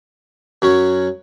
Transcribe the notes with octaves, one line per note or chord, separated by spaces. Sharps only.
F#2 F#3 C#4